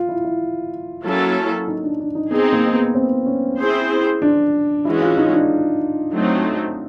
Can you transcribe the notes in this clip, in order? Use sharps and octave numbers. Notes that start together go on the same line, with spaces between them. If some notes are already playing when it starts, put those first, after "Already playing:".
Already playing: F4
E4
E4
F#3 A#3 C#4 E4 A4
D#4
D4
D4
D#4
B3 C4 D#4 G#4
A#3
B3
C4
C#4
C4 E4 G#4 C5
D4
E3 G#3 C#4 E4 F#4
F4
D#4
D4
F#3 A3 C4 D#4